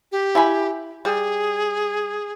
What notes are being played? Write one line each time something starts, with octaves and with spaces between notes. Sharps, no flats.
G4
E4 G#5 B5
G3 G#4